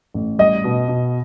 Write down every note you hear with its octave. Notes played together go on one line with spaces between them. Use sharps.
A1
G3 D#5
B2
B2